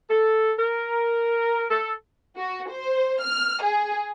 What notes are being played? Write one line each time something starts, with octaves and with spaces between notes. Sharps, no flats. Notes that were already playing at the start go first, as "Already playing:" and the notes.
A4
A#4
A4
F#4
C5
F6
G#4